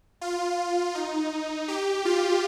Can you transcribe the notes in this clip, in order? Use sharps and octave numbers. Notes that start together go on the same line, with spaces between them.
F4
D#4
G4
F4